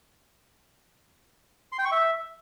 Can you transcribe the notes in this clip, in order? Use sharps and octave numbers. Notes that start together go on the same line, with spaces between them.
C6
G5
C#6
E5